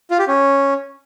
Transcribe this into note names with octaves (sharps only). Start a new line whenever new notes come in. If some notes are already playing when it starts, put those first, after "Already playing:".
F4
G4
C#4